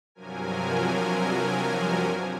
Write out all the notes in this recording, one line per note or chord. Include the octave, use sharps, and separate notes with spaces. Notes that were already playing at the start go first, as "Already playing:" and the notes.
G2 C3 F3 F#3 A#4 G#5